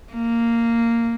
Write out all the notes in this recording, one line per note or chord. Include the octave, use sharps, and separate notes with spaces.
A#3